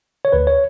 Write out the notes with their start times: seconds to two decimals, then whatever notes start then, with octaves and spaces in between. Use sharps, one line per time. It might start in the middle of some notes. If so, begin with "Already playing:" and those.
0.25 C#5
0.32 D2 B4
0.47 C#5